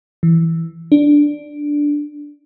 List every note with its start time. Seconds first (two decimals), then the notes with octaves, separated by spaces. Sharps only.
0.23 E3
0.92 D4